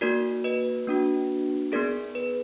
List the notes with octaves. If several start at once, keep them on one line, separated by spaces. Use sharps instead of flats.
A#3 D#4 F#4 A#4 D5
B4 D#5
A#3 D4 F#4
B3 D#4 G#4 A#4 D5
B4